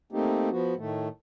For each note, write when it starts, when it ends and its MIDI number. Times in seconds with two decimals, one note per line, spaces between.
0.12 0.49 57
0.12 0.49 58
0.12 0.49 60
0.12 0.49 63
0.12 0.49 67
0.50 0.75 53
0.50 0.75 59
0.50 0.75 66
0.77 1.08 45
0.77 1.08 51
0.77 1.08 57